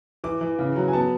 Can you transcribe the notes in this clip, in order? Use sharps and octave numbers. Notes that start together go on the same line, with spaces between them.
E3 D6
E3
C#3
F#3
G#5
B3 A5